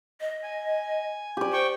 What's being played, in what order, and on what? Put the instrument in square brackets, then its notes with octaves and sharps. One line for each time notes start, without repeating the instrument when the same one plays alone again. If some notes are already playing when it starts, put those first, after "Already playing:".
[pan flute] D#5
[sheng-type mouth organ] G#5
[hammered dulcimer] G4 D5
[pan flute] C5 [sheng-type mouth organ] G5 C#6